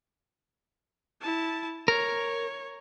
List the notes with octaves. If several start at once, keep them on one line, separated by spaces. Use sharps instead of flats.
E4 A5
A#4 C#5